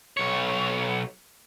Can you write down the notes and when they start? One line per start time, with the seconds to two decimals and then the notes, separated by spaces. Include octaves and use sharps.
0.17 B1 C#5